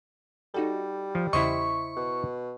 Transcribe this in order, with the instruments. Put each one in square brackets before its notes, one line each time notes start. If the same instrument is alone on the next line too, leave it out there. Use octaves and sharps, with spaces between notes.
[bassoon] G3 [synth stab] D#4 F#4 A4
[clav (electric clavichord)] F3
[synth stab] E2 C#3 B6 [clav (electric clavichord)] E4 C5 D#5 [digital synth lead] C#6
[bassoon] B2